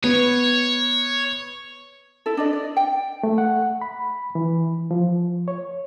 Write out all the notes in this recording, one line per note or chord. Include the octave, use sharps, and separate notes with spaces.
B3 C#5
E4 A4
D4 D5 D#5
D5
G5
A3
F#5
B5
E3
F3
C#5